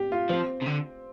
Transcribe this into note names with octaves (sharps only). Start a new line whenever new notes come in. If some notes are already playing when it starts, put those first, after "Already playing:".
Already playing: G4
F4
F3 C4
C3
D3